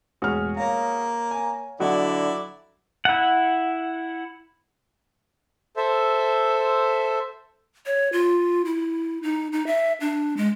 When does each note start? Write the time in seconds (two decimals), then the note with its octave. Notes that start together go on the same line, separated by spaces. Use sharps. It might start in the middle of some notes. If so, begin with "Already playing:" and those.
0.22 E1 A1 C#4 F#4 G#4 F6
0.57 A#3 C#5 F5 A#5
1.31 G#5
1.80 D3 F#3 E4 F#4 D5 D#5
3.05 E4 F#5
5.77 A4 C5 E5
7.86 C#5
8.12 F4
8.65 E4
9.22 D#4
9.52 D#4
9.67 E5
10.01 D4
10.37 G#3